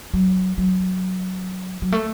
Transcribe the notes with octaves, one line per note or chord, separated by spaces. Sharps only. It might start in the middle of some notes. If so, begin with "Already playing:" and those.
F#3
F#3
F#3
A3